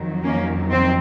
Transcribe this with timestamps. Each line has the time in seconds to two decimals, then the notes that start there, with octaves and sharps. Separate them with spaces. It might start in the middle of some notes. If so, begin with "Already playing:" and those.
Already playing: F2 D#3 F#3
0.24 A#3 C#4
0.71 C4